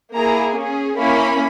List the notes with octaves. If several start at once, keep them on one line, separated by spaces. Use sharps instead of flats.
A#3 E4 G#4 A#5
C#4 G#4
A#3 C#4 E4 B5